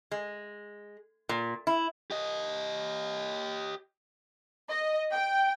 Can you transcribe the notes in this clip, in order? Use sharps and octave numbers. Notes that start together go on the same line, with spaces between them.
G#3
A#2
E4
G4 D#5
D#5
G5